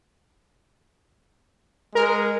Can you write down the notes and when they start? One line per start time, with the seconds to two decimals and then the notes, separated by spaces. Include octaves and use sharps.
1.95 G#3 A#4